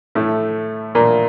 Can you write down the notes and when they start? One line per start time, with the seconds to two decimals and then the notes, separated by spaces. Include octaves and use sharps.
0.15 A2 A3
0.95 A#2 A#3